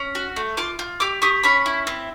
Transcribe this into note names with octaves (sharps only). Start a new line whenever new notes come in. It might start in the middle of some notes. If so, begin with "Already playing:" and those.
Already playing: C#4
F#4
A3
F4 C6 D6
F4
G4 D6 E6
G4 C#6 D#6
C#4 B5 C#6
E4
C4